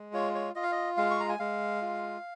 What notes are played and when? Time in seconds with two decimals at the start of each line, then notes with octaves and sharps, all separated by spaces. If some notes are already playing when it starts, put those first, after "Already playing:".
Already playing: G#3
0.13 F4 C#5
0.35 C#5
0.55 F4 D#5
0.63 F5
0.72 D#5
0.97 G#3 F5
1.11 C#6
1.20 A#5
1.29 G#5
1.39 G#3 F5
1.82 F4